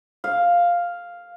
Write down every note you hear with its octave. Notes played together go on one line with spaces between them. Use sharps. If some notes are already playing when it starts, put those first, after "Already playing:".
F5